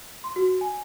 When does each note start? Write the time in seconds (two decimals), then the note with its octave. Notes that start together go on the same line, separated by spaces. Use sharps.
0.24 C6
0.36 F#4
0.61 G#5